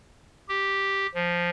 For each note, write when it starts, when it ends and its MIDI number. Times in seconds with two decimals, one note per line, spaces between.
0.49 1.07 67
1.15 1.50 53